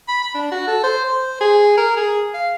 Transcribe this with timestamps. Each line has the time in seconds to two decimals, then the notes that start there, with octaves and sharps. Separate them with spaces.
0.08 B5
0.22 B5
0.34 D4
0.52 F#4
0.67 A4
0.83 C5
1.05 C5
1.41 G#4
1.77 A#4
1.97 G#4
2.34 F5